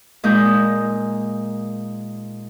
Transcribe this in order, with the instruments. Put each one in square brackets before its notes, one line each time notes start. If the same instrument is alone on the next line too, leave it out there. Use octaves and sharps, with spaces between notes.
[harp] A#2 G#3 D#4 G6